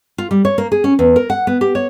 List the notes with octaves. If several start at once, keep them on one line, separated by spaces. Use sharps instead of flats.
F4
G3
C#5
A#3
G#4
C#4
E2
A#4
F#5
B3
G4
C#5